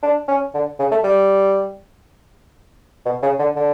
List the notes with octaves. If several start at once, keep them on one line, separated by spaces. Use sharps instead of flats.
D4
C#4
D3
C#3
A3
G3
B2
C#3
D3
D3